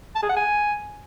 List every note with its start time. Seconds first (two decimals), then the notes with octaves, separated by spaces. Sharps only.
0.16 A5
0.23 G#4
0.30 F#5
0.37 G#5